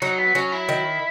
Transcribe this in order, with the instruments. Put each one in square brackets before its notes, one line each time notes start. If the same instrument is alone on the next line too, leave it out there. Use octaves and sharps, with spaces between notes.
[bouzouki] F#3 [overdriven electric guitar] D#4
[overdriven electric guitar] B3
[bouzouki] F#3 [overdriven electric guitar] C#4
[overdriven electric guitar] E4
[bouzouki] D#3